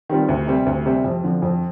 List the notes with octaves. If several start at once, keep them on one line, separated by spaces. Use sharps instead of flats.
D#3 G3 C4 F4
D2
C3 G3 C4
D2
C3 G3 C4
F2
D3 F3 C4
F2